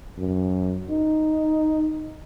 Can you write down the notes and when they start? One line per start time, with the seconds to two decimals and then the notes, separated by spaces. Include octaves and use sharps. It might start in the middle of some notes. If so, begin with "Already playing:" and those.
0.18 F#2
0.90 D#4